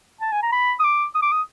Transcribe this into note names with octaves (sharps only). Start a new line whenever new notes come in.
A5
G#5
A#5
B5
D#6
D6
D#6
D6
D#6